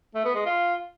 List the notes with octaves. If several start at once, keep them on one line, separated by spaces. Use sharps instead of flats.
A3
B3
G#3
F4